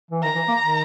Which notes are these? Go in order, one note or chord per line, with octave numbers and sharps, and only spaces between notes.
E3
D#3 A#5
E3
A#3
D#3